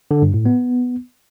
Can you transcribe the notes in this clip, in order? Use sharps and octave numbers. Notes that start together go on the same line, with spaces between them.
D3
G2
A2
B3